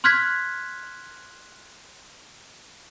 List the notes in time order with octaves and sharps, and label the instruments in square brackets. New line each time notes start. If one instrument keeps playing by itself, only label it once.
[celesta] C6 F6 F#6 G#6 B6